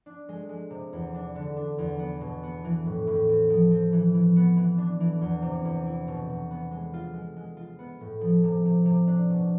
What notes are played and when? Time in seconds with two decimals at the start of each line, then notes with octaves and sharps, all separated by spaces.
0.06 D4
0.29 G#3
0.49 G#3
0.70 C3
0.93 E2
1.14 D4
1.35 D3
1.57 D4
1.78 E2
1.99 B3
2.21 B2
2.43 B3
2.64 E3
2.86 A2
3.07 A2
3.29 C4
3.50 F3
3.71 C4
3.93 E3
4.14 E3
4.36 B3
4.57 E3
4.78 D4
5.00 E3
5.21 E2
5.42 C3
5.65 E2
5.86 E4
6.08 B2
6.29 B2
6.51 B3
6.71 G#3
6.94 F4
7.14 G#3
7.36 G#3
7.57 F4
7.79 B3
8.01 A2
8.21 F3
8.44 C3
8.65 C3
8.85 C3
9.07 D4
9.30 B2